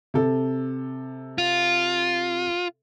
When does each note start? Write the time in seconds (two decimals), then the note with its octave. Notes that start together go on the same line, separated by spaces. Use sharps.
0.14 C3 A4
1.38 F4